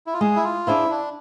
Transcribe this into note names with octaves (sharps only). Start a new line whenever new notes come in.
E4
F4
G#3 G#4
E4
F4
D4 E4 G#4 C5 F5
D4